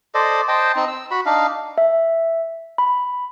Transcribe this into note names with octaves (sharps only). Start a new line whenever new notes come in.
A4 C5 D5 D#5
C5 D#5 G5 A5
C4 D#4
E6
F#4 B5
D4 D#4 F5
E5
B5